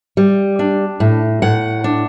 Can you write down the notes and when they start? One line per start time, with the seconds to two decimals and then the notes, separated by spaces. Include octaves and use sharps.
0.17 G3
0.59 D4
1.00 A2
1.42 A2 F#5
1.84 D4